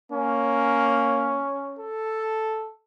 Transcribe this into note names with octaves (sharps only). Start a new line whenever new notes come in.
A#3 C#4
A4